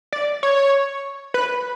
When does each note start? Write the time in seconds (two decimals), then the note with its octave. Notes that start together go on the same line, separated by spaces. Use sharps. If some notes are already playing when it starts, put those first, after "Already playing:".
0.13 D5
0.43 C#5
1.34 B4